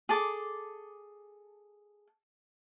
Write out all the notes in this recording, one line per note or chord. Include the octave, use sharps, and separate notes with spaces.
G#4 A4 D6